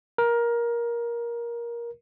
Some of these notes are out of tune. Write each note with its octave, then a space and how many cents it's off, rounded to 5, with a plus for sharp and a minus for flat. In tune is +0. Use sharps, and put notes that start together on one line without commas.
A#4 +15